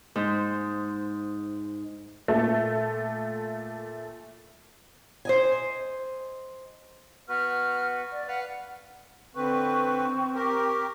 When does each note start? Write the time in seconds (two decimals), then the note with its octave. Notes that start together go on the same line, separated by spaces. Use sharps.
0.15 G#2 C5
2.28 A#2 A3
5.25 C5 D#5 G#5
7.29 B3 F#4 B4 F6
8.12 D5
8.28 B4 F5 F#5
9.35 D3 C4 B4 C#6
10.35 G4 A#4